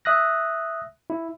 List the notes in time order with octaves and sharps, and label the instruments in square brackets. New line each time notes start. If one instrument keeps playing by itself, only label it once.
[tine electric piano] E5 D#6 F#6 A#6
E4